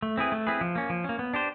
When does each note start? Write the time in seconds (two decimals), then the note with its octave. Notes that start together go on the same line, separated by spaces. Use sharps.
0.03 A3
0.17 C4 E4 G#4 B4
0.32 A3
0.47 C4 E4 G#4 B4
0.61 F3
0.75 A#3 C#4
0.90 F3
1.04 A#3 C#4
1.19 B3
1.33 D4 G4 C5